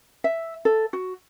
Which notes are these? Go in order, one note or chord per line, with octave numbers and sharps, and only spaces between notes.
E5
A4
F#4